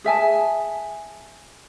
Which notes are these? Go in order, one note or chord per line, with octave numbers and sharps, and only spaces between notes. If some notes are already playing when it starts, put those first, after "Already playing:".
G#4 E5 G#5 A5